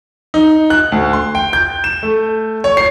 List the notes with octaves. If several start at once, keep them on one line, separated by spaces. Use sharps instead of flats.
D#4
F#6
D2
C6
G5
G6
E7
A3
C#5
C7